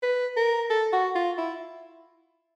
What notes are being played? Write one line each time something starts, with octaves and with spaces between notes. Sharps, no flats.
B4
A#4
A4
F#4
F4
E4